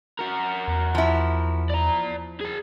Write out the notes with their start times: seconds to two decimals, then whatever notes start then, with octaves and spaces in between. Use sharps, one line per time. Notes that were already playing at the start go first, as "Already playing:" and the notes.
0.19 F#4 A#4
0.68 E2
0.95 F3 E4
1.70 D5 A#5
2.41 G#4 A5